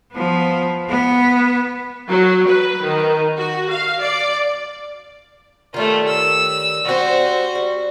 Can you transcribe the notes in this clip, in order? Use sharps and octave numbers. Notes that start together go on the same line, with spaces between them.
F3 B3
B3
F#3
B4
D#3
F#4
F5
D5
D#3 G3 A3 F4 C#5
E6
G3 C4 F#4 C5
G3